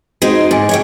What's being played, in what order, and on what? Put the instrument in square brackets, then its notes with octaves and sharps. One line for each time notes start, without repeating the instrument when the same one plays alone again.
[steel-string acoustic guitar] G#3 C4 D#4 [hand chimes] F#4
[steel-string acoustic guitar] G#2 [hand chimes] G#4 G#5
[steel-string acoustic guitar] C#5 E5 G5